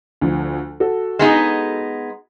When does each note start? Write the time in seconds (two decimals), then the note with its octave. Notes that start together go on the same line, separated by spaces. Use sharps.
0.21 D2 F3
0.80 F#4 A4
1.19 G#3 B3 D#4